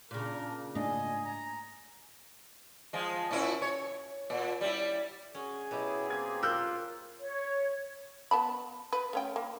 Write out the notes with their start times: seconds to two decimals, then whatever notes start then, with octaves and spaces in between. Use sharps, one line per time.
0.11 A#2 C#3 D4 A#4
0.75 G#2 A3 D4 D#5 G#5
1.25 A#5
2.93 F3 G#3
3.31 A#2 C#4 E4
3.62 C#5
4.30 A#2
4.61 G3 E4
5.35 C#4 F#4 G#4
5.71 B2 F#3 E4 G4
6.10 A#3 C4 G4 G#6
6.43 F4 A#4 E6 F#6 G6
7.21 C#5
8.31 B3 A5 B5
8.93 B4
9.13 A3 C#4 G5
9.36 A#3